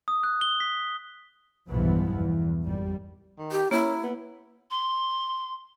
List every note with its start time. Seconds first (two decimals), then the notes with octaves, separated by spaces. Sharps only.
0.08 D#6
0.23 F#6
0.41 G7
0.60 B6
1.69 B1 E2 G2 E3 F3 B3
2.12 E2
2.62 G#1 F2 G3
3.39 D#3
3.52 G4
3.71 A#3 C#4 E4
4.03 B3
4.71 C6